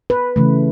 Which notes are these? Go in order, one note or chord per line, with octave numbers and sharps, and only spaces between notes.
B4
C#3 E3 A3